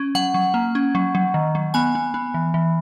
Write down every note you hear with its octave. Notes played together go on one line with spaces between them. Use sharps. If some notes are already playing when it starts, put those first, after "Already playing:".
Already playing: C#4
F#3 F#5
F#3
A#3
C#4
F#3
F#3
D#3
F#3
B3 G#5
B3
B3
E3
E3